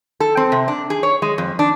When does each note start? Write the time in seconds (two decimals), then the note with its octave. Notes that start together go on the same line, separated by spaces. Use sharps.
0.20 A4
0.37 C4
0.52 C3
0.68 D4
0.90 G#4
1.03 C#5
1.22 G#3
1.38 F2
1.59 D4